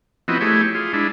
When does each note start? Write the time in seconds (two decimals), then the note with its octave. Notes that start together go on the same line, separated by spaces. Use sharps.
0.28 F3 B3 C4 E4 F#4 D#5
0.41 A3 E4 G4 G#4 C#5
0.75 F4 G#4
0.93 G#3 D4 E4